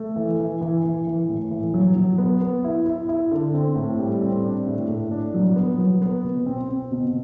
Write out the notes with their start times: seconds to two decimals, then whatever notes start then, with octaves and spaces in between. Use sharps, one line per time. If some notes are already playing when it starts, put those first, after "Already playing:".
Already playing: A3
0.16 E3
0.40 E3
0.61 E3
0.84 E3
1.07 E3
1.29 A2
1.51 E3
1.74 F#3
1.96 F#3
2.18 B3
2.41 B3
2.64 E4
2.86 E4
3.09 E4
3.31 D3
3.54 C4
3.76 A2
3.99 G3
4.22 C4
4.44 D4
4.67 A2
4.88 A2
5.11 D4
5.34 F#3
5.56 B3
5.78 F#3
6.02 B3
6.24 B2
6.46 C4
6.69 C4
6.91 B2